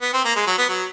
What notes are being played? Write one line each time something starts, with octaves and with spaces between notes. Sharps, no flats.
B3
C4
A#3
G#3
F#3
B3
F#3